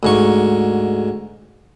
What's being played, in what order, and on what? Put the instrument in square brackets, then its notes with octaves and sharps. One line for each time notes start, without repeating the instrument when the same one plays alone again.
[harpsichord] D2 G#2 C#6